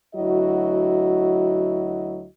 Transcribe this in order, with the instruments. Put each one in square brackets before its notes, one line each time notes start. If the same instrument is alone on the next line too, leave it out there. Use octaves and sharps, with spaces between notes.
[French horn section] D2 F#3 E4 F#4 D#5